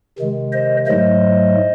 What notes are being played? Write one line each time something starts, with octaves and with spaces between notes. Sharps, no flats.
C3 D#3 G#3
C5 D#5
G#2 F#3 A3 C5 D#5